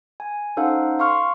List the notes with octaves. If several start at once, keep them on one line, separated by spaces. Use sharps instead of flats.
G#5
C#4 D#4 A4 C5 F5 F#5
F5 C6 C#6 F6